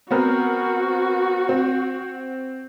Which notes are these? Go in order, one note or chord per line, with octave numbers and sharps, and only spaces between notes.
B3 C4 F#4 A#4
C4